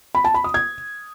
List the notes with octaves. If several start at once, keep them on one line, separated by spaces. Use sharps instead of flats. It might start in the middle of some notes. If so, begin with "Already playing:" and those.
B5
A5
B5
D#6
G#6